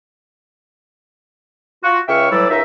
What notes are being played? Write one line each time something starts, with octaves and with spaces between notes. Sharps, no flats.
F4 F#4
C#2 C#3 E5 G5 C#6 F6
A2 E3 F#3 G3 D5 E6
C#2 F#2 D#4 E5